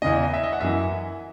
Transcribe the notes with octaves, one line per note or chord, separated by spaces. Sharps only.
E2 C#3 E3 D#5
E5
D#5
E5
D#5
F#5
F#2 E3 E5